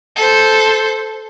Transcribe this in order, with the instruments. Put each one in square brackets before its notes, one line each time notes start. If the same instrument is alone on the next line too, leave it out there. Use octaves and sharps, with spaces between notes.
[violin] A4 C5